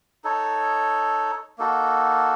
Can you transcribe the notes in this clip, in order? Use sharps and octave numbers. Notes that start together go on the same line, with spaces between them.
D#4 A4 C#5
A#3 D#4 F#4 A4